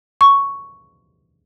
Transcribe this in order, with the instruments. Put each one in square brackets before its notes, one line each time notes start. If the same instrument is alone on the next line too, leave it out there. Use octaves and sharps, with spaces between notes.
[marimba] C#6